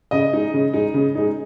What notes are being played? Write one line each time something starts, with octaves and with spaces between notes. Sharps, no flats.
C#3 D#5
G#3 D#4
C#3
G#3 D#4
C#3
G#3 D#4